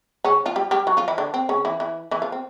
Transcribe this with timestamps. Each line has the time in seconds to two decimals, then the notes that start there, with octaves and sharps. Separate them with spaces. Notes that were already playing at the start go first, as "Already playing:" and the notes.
0.24 C#3 C#4
0.46 F3 F4
0.56 G3 G4
0.71 G3 G4
0.87 F#3 F#4
0.97 F3 F4
1.08 E3 E4
1.18 D3 D4
1.34 C4
1.49 C#3 C#4
1.65 E3 E4
1.80 E3 E4
2.11 E3 E4
2.22 F3 F4
2.32 C4